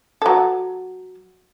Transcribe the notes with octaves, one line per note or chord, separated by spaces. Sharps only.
F#3 A4